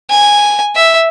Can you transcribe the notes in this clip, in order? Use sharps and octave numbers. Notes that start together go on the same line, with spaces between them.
G#5
E5